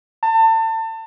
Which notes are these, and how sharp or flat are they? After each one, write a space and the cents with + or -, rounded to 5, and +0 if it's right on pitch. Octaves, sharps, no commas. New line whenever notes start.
A5 +30